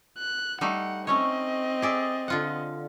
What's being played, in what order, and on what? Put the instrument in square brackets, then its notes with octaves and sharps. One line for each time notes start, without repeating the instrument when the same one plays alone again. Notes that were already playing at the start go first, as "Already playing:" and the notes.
[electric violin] F#6
[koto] G3 A3 D#4 [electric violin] F#5
[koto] A3 C#4 C#5 [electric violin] C4 D#5
[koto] G#4 D5 E5
D3 F4 F#5